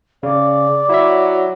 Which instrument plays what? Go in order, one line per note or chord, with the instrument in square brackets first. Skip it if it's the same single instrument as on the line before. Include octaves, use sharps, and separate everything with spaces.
[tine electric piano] C#3 [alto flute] D5
[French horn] F#3 [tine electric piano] E4 E5